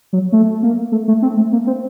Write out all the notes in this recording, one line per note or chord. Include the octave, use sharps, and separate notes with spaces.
F#3
A3
A#3
A3
A3
C4
A3
A#3
C4